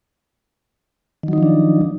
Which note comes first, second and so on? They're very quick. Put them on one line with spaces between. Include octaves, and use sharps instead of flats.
D#3 F#3 D#4 F3 D4